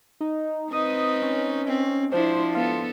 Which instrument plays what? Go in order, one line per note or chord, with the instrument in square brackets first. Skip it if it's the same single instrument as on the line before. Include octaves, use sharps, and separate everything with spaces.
[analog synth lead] D#4
[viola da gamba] C4 B4 [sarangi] D#4 [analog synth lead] D#6
[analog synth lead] C#4
[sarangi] C4
[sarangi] F3 [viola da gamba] D4 E4 [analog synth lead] C5
[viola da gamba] B3 A4 [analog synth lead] F4